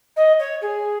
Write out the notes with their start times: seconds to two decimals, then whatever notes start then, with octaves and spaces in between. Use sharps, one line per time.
0.16 D#5
0.39 C#5
0.61 G#4